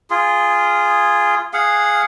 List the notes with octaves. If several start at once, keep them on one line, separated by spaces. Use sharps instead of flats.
F4 G#4
G#4 F5 F#5